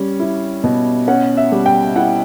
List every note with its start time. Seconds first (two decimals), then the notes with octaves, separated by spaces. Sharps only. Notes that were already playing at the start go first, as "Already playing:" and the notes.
Already playing: G3 C#4
0.19 E4
0.64 B2
1.08 C#4 F#5
1.37 E5
1.52 G3
1.66 G5
1.96 E4 F#5